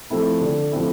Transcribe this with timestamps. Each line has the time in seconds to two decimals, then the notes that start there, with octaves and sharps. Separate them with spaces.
0.10 F3 A3 C4 E4
0.41 D3
0.72 F3 A3 C4 E4